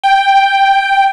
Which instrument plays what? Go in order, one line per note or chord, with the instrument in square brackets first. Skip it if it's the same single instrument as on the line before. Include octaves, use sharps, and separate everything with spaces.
[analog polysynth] G5